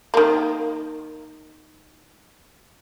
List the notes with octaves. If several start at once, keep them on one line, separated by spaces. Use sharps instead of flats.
D#3 A#3